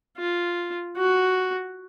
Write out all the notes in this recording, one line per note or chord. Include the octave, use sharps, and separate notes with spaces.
F4
F#4